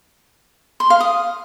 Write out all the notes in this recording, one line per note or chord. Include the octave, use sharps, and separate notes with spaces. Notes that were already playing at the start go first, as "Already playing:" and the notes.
C6
F5
D#6